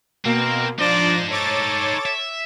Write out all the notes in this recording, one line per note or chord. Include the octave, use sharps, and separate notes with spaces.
B2 A#3 C4 A#4
F3 D4 D#4 C5 D5 A#6
A4 C#5 D6 A6
E5